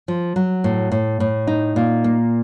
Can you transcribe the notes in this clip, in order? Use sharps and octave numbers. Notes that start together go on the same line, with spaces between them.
F3
F#3
A2
A2
A2
D#4
A#2
A#3